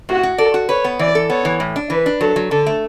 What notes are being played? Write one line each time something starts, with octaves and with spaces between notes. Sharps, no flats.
A2 F#4
F#4
A4 D5
F#4
B4 C#5
B3
E3 D5
A4
B3 C#5
E3
A2
D4
E3 B4
D4
F#3 A4
F#3
D3 A4
A3